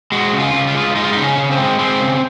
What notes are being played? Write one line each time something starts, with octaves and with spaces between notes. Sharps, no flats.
G#3 F#4
C#3
F4
C#3
F4
G#3
G#3 D#4
F4
C#3 D#4
C#4
C#3
C4
G#3
G#3 C4
C#3